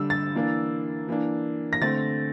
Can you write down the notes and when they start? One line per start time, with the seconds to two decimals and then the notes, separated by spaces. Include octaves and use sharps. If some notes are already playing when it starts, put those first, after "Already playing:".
Already playing: D3 G3 D4 E6
0.10 A6
0.35 E3 A#3 D4
1.08 E3 A#3 D4
1.73 A#6
1.81 D3 A3 C4 A6